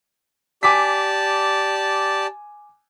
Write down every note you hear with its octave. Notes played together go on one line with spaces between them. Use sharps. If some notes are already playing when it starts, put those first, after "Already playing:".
G4 D5 G#5 A5 D6 B6